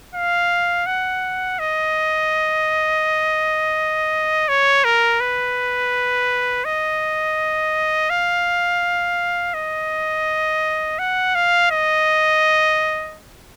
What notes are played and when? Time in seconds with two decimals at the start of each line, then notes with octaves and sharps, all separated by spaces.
0.14 F5
0.87 F#5
1.59 D#5
4.48 C#5
4.84 A#4
5.21 B4
6.65 D#5
8.10 F5
9.54 D#5
10.99 F#5
11.35 F5
11.71 D#5